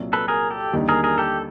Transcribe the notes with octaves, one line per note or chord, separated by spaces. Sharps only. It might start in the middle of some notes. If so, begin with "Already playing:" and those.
Already playing: C2 A#2 F#3
A4 B4
G#4 A#4
G4 A4
D#2 D3 G3 A#3 D#4
G#4 A#4
G#4 A#4
G4 A4